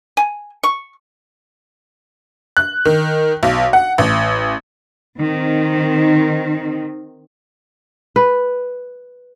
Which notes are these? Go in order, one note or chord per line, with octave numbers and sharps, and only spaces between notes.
G#5
C#6
F#6
D#3
B1
F#5
A1
D#3 C4
B4